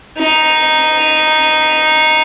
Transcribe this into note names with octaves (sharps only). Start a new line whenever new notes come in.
D#4